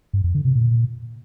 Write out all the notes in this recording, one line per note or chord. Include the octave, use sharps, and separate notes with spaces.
G2
F2
D3
C3
A#2